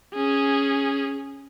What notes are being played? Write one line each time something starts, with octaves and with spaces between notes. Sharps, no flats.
C#4 G#4